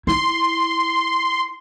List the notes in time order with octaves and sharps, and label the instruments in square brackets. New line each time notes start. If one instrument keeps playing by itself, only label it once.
[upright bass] E4 [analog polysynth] C6